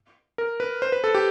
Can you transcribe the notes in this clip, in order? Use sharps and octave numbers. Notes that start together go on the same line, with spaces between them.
A#4
B4
C5
B4
A4
G4